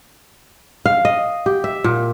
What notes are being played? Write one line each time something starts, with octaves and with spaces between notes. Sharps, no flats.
F5
D#5
G4
E5
A#2